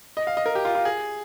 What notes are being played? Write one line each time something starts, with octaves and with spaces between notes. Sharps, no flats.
D#5
F5
D#5
A#4
G4
F4
F4
G#4